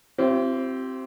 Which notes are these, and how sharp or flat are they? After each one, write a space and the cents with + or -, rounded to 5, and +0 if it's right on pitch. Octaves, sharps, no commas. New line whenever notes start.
C4 +0 E4 +40 G4 -30